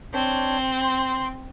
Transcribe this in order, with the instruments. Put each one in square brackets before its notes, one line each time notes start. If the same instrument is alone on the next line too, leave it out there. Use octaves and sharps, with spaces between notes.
[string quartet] C4 [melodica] D4 C5 C#5
[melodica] C6